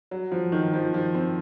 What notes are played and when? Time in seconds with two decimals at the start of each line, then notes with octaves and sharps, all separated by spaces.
0.11 F#3
0.32 F3
0.52 D#3
0.73 F3
0.94 F3
1.14 C4